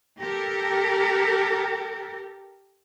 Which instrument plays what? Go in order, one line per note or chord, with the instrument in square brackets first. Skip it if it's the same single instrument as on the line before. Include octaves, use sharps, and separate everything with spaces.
[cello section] G4 A4 A#4